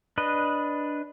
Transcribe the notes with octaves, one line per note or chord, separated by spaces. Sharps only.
D4 B4 D#5